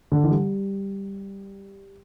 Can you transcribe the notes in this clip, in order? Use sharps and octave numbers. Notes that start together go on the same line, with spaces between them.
D3
E3
G3